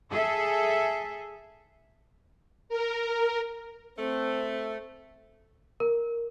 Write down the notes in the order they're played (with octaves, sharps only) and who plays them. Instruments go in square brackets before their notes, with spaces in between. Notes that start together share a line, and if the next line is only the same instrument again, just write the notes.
[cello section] G#4 A4 E5
[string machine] A#4
[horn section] A3 [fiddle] C4
[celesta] A#4